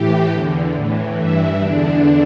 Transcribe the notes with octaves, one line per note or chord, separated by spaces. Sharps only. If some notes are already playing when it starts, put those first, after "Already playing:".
Already playing: A2 E3 G4
E2 D3
A2 E3
G2 E3 E4
E2 D3 D4